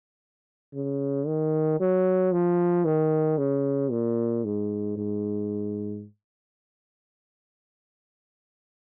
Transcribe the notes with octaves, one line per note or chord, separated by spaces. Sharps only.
C#3
D#3
F#3
F3
D#3
C#3
A#2
G#2
G#2